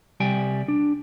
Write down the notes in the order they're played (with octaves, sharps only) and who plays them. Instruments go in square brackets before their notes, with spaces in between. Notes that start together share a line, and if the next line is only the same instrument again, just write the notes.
[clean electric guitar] C2 G3 G5 G#5
D4